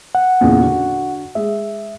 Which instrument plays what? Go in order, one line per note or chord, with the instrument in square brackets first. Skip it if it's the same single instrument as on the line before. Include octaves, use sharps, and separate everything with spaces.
[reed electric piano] F#5
[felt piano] E2 A#2 C#3
D3 F#4
[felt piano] G#3 [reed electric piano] E5